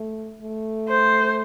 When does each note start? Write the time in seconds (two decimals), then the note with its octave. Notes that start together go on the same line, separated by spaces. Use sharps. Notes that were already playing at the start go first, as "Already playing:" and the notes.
Already playing: A3
0.41 A3
0.88 C5